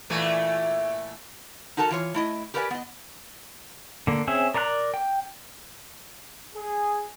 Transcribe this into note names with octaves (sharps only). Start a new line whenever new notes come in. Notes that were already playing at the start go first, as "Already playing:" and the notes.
A#2 E3 A3
D#4 F#4 A4 A#4 A5
E3 F4 C#5
A3 E4 D#5
G4 A#4 B4 D5 F5 G#5
B3 D#5
D3 A#3
C4 C#4 G#4 E5
A#4 D5 A#5 C6 F#6
G5
G#4